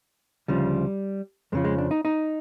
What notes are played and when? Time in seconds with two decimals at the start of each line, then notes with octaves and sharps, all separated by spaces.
0.48 D2 C#3 F3 G3
1.52 F2 C#3 F3 G#3
1.65 G#3
1.78 D4
1.91 D#4
2.05 D#4